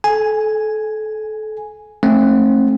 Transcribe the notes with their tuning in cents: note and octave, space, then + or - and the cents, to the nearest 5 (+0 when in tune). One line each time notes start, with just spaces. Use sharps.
A4 -30 G#5 +0
A3 +0 C4 +40